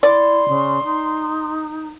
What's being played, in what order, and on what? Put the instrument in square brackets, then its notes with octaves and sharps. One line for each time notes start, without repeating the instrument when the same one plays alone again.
[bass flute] E4 [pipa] D5 [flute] C6
[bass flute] C#3
D#4